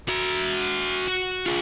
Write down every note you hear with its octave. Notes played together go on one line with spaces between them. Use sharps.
F#4 E5
F#4
F4 G#4